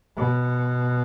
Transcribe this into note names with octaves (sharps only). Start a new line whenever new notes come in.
B2